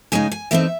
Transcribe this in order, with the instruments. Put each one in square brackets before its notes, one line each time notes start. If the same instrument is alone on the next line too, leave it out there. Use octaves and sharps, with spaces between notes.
[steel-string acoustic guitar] C#3 G#3 D#4 G#5
G#5
E3 A3 C4 D#4 E5